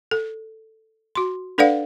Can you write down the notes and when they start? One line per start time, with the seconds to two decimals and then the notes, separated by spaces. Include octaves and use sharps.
0.11 A4
1.15 F#4 C6
1.58 D4 A4 B4 D5 F5 F#5